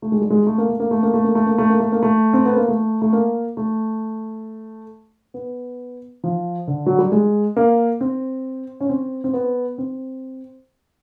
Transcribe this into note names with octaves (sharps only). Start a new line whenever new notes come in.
A3
G#3
G3
G#3
A3
A#3
A3
A#3
A3
A#3
A3
A#3
A3
A#3
A3
A#3
A3
A#3
A3
C4
B3
A#3
A3
A3
A#3
A3
B3
F3
D3
F#3
G3
G#3
A#3
C4
C#4
C4
C4
B3
C4